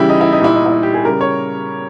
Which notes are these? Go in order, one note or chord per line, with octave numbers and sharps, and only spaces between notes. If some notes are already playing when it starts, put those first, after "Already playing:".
Already playing: C#3 E3 G3 E4 G4
D#4
E4
D#4
A#2 G3 E4
D#4
E4
D#4
G4
G#4
C#3 G3 A#4
C#5